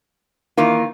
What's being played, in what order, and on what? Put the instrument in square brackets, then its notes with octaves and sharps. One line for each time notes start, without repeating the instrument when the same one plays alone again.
[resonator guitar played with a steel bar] D#3 E3 F4 [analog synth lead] A#3